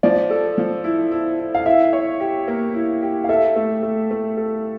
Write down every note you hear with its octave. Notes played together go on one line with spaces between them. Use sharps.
F3 D5
A4
F3
E4
E4
E4
F5
E4 E5
C#5
G4
A#3
E4
G4
F5
A4 E5
A3
A3
A3
A4